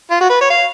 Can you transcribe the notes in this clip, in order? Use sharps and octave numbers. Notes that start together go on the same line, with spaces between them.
F4
F#4
B4
C#5
F5